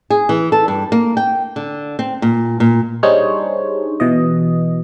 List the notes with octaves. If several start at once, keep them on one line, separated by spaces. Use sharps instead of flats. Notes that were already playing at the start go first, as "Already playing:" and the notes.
G#4
E3
A4
G2
A#3
G5
D3
C4
A#2
A#2
G3 D4 D#4 G#4 C5 C#5
B2 E3 D#5